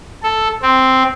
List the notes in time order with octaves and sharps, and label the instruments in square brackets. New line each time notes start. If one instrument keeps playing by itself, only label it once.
[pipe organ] A4
C4